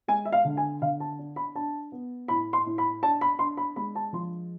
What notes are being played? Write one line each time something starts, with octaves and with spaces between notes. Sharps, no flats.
G#3 G#5
E5
F5
D3
G#5
D3 F5
A5
D4
B5
D4 A5
B3
A2 B5
C6
A2
B5
D4 A5
B5
D4 C6
B5
G#3 B5
A5
F3 C6